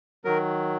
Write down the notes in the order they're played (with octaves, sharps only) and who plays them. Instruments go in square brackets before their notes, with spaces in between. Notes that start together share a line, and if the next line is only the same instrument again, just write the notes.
[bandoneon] D#3 F#3 A#4